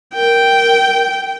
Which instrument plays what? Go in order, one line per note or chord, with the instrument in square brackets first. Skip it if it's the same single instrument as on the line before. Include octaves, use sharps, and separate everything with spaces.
[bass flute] A#4 [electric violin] G5